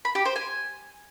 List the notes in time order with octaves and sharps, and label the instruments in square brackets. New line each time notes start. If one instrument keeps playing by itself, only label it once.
[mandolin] B5
G4
C5
G#5